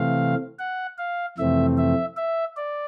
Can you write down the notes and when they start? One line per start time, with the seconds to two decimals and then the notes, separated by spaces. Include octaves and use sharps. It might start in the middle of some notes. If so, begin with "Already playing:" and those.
Already playing: C3 E3 A3 C4 F5
0.59 F#5
0.98 F5
1.38 F2 C3 E3 A3 C4 E5
1.78 E5
2.17 E5
2.57 D5